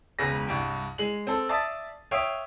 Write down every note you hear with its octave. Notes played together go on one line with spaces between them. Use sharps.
E1 C#2 C#3 B4 A#6
C2 G2 G5
G#3 F#7
C4 A4
D5 E5 F5 A5 D#6 A6
C#5 E5 F5 G5 D#6